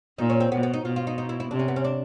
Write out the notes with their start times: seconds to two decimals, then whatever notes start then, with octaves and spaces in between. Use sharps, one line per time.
0.18 A#2 D#4
0.30 C#4
0.40 C4
0.52 B2 B3
0.63 B3
0.74 D#4
0.85 B2 F4
0.96 F4
1.07 D#4
1.18 D#4
1.29 E4
1.40 E4
1.51 C3 D4
1.59 C#4
1.68 B3
1.76 C#4
1.85 D4